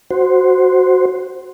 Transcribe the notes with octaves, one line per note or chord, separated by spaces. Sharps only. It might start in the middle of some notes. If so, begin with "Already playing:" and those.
F#4 C5